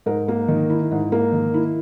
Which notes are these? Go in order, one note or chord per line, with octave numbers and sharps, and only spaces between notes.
G#2 A#4
A#3
D#3
E4
G#2
A#3
D#3
E4